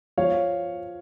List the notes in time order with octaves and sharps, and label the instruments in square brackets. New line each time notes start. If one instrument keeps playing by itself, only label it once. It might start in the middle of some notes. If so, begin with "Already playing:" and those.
[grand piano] F3 C#5 F5